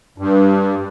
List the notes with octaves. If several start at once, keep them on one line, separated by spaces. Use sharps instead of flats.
G2